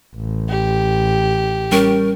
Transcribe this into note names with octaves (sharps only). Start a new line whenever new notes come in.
A1
G4
G3 C#4 A#4